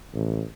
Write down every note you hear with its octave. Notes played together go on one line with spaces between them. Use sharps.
A1